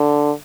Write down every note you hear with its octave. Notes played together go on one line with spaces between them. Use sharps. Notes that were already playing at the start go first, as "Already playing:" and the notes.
Already playing: D3